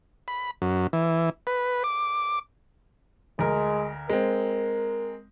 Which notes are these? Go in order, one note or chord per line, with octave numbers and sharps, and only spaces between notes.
B5
F#2
E3
B4
D6
D2 G#3 A#4
G#3 C4 A#4